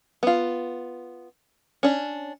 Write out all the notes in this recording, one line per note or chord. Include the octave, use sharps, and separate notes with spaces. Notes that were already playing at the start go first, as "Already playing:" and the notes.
B3 F4
C#4 D4